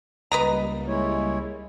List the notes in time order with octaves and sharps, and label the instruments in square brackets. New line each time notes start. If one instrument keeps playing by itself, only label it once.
[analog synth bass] C#2 [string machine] G3 A#3 [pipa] B4 D#5 A#5
[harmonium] G#3 E4 C#5